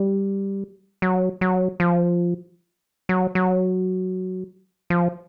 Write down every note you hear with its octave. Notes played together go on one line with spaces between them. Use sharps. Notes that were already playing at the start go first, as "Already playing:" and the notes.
Already playing: G3
F#3
F#3
F3
F#3
F#3
F3